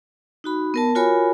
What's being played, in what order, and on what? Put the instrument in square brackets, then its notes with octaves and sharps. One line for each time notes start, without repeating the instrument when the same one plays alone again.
[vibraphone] D#4 F#4 B5
B3 A#4 A5
F4 F#4 A#4 C#5 G#5 B5